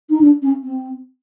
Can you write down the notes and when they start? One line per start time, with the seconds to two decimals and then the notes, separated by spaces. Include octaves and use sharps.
0.10 D#4
0.21 D4
0.42 C#4
0.63 C4